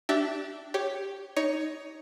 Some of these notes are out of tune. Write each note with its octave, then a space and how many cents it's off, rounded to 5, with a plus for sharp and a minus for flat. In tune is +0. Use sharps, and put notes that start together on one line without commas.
D4 +0 G4 -30 E5 +0
G4 +0 C#5 +0
D#4 +5 C#5 +10